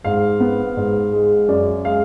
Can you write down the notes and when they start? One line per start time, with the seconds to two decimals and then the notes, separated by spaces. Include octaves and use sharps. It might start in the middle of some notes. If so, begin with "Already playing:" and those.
0.04 G#2 F5
0.40 B3
0.77 G#2
1.13 G#3
1.48 F#2 D5
1.85 G#3 F5